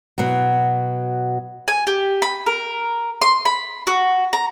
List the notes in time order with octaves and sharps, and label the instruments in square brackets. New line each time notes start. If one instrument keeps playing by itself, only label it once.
[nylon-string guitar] B2 F#3
[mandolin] G#5
G4
B5
A#4
C6
B5
F#4
A#5